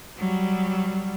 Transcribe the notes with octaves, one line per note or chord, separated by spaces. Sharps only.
F#3 G3